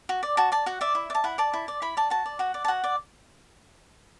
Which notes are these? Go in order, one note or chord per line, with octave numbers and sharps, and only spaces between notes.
F#4
D5
F#4 A5
D5 A5
F#4 F#5
D5 E5
E4
D5
A5
E4 F#5
D5 A5
E4
D5
E4 B5
D5 A5
F#4 A5
D5
F#4 F#5
D5
A5
F#4 F#5
D5